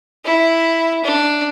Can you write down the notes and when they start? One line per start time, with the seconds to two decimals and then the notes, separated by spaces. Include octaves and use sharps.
0.25 E4
1.04 D4